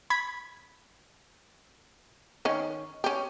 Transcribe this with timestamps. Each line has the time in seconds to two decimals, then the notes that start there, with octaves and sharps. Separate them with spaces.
0.10 B5 G#6 B6
2.45 D#3 C#4
3.04 C#4 G4